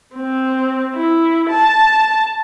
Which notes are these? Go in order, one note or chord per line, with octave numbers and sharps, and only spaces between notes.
C4
E4
A5